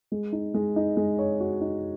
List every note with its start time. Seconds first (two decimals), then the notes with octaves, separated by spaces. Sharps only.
0.12 G#3
0.32 D#4
0.54 G#3
0.76 D#4
0.97 G#3
1.19 C#5
1.40 F#4
1.61 D#4